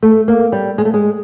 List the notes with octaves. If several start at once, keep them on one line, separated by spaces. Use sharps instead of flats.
A3
A#3
G3
G#3
A3
G#3